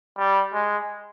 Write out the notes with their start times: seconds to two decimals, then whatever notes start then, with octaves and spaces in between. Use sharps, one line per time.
0.18 G3
0.53 G#3